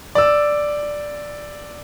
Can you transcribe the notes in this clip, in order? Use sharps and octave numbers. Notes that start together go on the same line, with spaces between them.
D5 E6